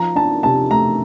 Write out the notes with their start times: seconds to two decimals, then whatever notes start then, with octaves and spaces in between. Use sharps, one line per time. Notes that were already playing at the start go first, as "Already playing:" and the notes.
Already playing: F3 A#5
0.15 D4 A5
0.43 C3 A5
0.71 A3 A#5